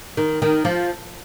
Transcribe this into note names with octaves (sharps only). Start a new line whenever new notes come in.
D#3
D#3
F3